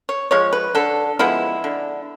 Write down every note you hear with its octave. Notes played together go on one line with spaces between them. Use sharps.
C#5
F3 G#3 C#5
B4
D3 A4
F3 G#3 B3 E4
D3